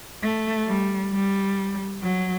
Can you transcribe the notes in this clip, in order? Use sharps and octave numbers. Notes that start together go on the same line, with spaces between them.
A3
G3
G3
F#3